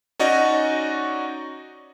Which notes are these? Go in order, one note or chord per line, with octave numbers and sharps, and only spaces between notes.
C#4 D#4 F#4 D5 D#5